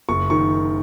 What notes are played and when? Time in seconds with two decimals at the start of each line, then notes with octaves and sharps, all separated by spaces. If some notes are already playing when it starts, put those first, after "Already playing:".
0.09 F#1 C#6
0.30 D#3 C#6